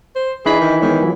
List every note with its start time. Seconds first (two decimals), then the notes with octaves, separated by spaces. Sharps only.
0.16 C5
0.46 E3 D4 D#4 G#4 B5 B6
0.61 D#3
0.82 D#3 G#3 B3 C#5
1.01 F3 F#3 F4